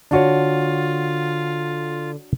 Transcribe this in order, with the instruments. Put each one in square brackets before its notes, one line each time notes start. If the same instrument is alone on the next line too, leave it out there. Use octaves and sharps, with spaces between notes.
[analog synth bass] D3 [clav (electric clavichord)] D4 F#4 C#5 [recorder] F4